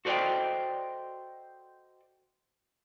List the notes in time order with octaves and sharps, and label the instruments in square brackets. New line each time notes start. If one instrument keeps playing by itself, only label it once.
[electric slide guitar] F#4 A4 C5 D5 D#5 G5